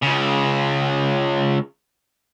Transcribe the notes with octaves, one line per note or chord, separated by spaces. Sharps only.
C#2 C#3